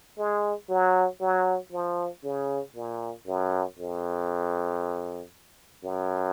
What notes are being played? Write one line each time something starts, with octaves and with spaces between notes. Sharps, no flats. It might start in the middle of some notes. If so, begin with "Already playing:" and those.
G#3
F#3
F#3
F3
C#3
A#2
F#2
F2
F#2